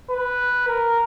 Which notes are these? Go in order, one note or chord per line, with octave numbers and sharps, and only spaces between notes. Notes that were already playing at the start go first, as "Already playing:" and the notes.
B4
A#4